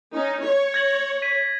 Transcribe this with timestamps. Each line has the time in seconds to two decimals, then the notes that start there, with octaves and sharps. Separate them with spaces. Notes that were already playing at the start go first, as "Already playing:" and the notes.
0.13 C#4 D#4
0.43 C#5
0.74 G#6 A#6 F#7
1.22 B6 D#7